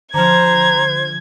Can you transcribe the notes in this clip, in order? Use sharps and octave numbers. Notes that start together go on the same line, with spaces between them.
D3 F3 C5 A#5 G#6